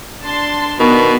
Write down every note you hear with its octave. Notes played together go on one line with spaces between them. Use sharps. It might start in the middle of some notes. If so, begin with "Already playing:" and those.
D4 A5 C6
B2 D#3 B3 D4 B4